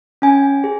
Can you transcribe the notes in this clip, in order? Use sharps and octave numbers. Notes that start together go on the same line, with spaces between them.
C#4 G#5
G#4